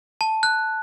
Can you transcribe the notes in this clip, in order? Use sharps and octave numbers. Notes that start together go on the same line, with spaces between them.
A5
F#6